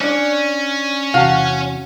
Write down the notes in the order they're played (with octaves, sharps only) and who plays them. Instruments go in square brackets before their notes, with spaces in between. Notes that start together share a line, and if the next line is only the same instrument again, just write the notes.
[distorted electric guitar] C#4 [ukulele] D4 D5
[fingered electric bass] E2 C3 [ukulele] F#4 A5 [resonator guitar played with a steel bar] F5